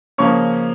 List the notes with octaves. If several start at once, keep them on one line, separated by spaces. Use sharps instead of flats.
C#3 F3 A#3 C#4 C#6